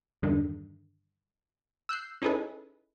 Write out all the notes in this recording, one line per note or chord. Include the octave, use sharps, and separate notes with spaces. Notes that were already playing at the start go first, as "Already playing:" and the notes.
E2 G2 D3 D#3
E6 F#6 G6 C7
C#4 D#4 E4 G#4 A4 B4